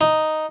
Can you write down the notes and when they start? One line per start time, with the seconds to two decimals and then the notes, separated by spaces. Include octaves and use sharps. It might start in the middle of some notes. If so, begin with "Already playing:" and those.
0.01 D#4